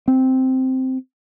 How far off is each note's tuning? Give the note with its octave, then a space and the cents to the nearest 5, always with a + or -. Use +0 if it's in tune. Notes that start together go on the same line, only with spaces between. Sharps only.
C4 -5